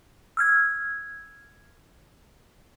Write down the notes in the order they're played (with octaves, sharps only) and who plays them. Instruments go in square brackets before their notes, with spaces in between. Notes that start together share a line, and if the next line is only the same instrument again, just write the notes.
[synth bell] E6 F6 G#6